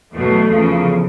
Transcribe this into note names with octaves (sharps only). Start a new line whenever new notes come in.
E2 B2 F#3 A3
E2 C#3 F3